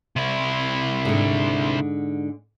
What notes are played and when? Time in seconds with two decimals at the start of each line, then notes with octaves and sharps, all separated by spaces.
0.16 C3 E4
1.05 G#2 D3